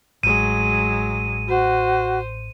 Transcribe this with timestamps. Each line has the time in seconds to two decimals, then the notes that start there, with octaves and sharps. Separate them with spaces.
0.23 A1 F#3 G#3 D#7
1.48 F#4 C5